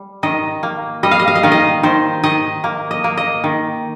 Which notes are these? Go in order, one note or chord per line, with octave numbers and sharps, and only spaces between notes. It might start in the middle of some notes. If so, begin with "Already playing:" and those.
Already playing: G3
D#3 D#5
A#3
G3 D#5
F5
D#5
F5
D#5
D#3 F5
D#5
D#3 C5
D#3 D#5
A#3
D#5
A#3
D#5
D#3